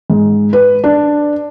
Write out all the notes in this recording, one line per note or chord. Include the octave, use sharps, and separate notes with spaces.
G#2
B4
D4